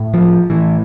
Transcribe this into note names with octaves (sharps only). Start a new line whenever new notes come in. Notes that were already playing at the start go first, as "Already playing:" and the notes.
Already playing: A2
F3
A2 E3